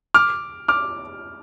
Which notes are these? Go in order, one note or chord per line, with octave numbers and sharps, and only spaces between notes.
D6 F6
D6 F6